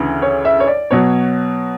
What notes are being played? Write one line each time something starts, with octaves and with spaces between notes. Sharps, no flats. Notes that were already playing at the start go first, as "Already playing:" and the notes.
Already playing: D2 C#3 E3
C#5
E5
C#5
D5
B2 F#3 C#5